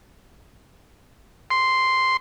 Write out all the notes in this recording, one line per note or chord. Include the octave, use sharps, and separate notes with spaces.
C6